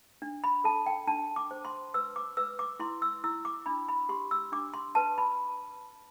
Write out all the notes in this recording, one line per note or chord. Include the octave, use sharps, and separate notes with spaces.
D4
B5
A4 A5
G5
D4 A5
D6
C5
C6
B4 E6
D6
B4 E6
D6
E4 C6
E6
E4 E6
D6
D4 B5
B5
G4 C6
E6
D4 D6
C6
B4 A5
B5